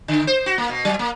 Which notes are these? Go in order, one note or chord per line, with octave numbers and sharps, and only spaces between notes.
D3
C5
F#4
A#3
B2
F#3
A#3